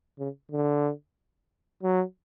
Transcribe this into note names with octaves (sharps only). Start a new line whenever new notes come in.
C#3
D3
F#3